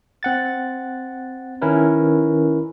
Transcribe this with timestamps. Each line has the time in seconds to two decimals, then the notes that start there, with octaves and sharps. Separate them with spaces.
0.23 C4 F#5 A6
1.62 D#3 C#4 E4 A#4 B4